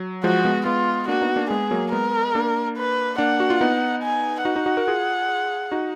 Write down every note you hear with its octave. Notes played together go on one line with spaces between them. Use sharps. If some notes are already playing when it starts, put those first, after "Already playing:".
Already playing: F#3
F3 G#3 F#4
G#3 B3
G#3 B3 F4
A#3 D4 F#4
B3 D#4
A#3 D4
G#3 B3 G#4
F#3 A#3
G#3 B3 A#4
A#3 D4
B4
A#3 D4 F#5
F#4
F4
B3 D#4
G#5
D#4 F#4 F#5
D#4 F#4
D#4 F#4
F#4 A#4
F4 G#4
D#4 F#4